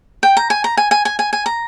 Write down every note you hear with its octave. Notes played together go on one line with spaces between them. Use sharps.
G5
A#5
G#5
A#5
G#5
G#5
G#5
G#5
G#5
A#5